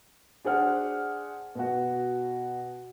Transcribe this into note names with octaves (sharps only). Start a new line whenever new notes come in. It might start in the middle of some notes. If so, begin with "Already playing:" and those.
D4 G#4 C5 F#5 F6
B2 F#4